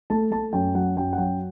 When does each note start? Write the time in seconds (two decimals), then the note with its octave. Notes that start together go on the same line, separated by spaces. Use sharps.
0.10 A3 A5
0.31 A3 A5
0.53 F#2 G5
0.75 F#3 F#5
0.97 F#2 G5
1.13 F#5
1.18 F#3 G5